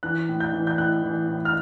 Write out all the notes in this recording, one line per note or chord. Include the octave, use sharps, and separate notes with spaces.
E3 F#6
A2
G6
E3
G6
A2 F#6
E3
A2
F6